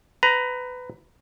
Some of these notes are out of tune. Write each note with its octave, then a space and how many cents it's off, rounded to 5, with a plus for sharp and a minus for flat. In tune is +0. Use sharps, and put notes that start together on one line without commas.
B4 +20 A#5 +10